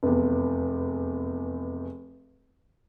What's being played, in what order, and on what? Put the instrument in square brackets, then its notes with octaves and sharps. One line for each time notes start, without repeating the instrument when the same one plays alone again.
[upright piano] F1 E2